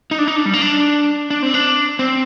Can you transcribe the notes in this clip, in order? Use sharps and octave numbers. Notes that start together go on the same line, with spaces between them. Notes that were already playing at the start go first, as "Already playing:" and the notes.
D#4
D4
D#4
D4
G3
A#3
D4
D4
C4
D4
C4